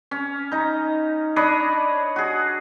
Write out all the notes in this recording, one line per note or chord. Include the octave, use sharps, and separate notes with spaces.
C#4
D#4 A#5
D4 C#5 D#5 B5
F#4 G#4